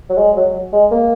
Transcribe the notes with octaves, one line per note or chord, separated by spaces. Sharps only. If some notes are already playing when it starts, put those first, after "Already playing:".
F#3
G#3
F#3
G#3
A#3